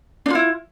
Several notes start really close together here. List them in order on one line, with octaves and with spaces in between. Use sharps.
D4 F4 E4